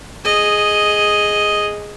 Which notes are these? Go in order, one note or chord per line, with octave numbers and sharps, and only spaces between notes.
G#4 D#5